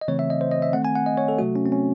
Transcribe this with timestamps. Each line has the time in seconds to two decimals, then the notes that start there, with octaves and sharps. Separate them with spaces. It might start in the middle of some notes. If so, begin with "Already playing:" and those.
0.01 D#5
0.08 C#3 E3 A3 C4 C#5
0.19 E5
0.30 D#5
0.41 C5
0.51 D#5
0.62 E5
0.73 D#3 A3 C4 F#5
0.85 G#5
0.95 F#5
1.06 D#5
1.17 C#5
1.28 A4
1.39 C3 F#3 A3 F#4
1.56 C#4
1.66 C4
1.72 C#4